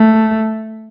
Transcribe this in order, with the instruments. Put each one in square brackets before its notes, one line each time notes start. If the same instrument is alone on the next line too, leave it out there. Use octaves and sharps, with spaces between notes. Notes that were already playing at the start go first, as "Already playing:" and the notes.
Already playing: [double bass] A3